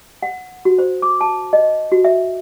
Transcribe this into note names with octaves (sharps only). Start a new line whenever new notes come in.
F#5
F#4
C5
D6
A5
D#5
F#4
E5